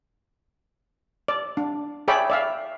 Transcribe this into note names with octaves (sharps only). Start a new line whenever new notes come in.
D5
D4
G#4 C#5 D5 E5 G5 B5
D5 E5 F5